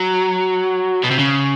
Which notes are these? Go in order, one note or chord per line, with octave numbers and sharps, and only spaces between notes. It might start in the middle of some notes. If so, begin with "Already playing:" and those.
Already playing: F#3
B2
C3
C#3